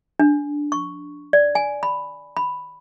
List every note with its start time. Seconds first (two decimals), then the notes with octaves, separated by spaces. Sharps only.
0.19 D4
0.72 C#6
1.33 D5
1.55 G#5
1.83 B5
2.37 B5